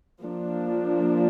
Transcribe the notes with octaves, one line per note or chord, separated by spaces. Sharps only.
F3 A#3 D4